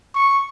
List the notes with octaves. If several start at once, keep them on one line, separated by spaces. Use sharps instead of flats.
C#6